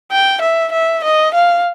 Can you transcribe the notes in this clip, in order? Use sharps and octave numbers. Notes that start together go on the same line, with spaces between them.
G5
E5
E5
D#5
F5